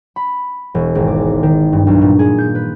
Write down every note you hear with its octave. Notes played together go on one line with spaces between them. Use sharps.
B5
E1
G#1
D6
D#3
G2
B1
A#2
G#4
G6
B4